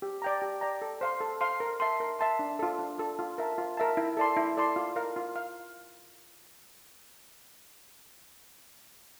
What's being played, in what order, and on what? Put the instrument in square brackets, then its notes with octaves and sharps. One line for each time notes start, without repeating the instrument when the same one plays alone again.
[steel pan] G4
D5 G5 A#5
G4
D5 G5 A#5
A4
C5 F5 C6
A4
C5 F5 C6
A#4
E5 A5 C6
A#4
E5 A5 C6
D4
F4 A4
D4
F4 A4
F4
A#4 E5 A5
F4
A#4 E5 A5
E4
A4 D5 A5 C6
E4
A4 D5 A5 C6
F4
A#4 F5
F4
F5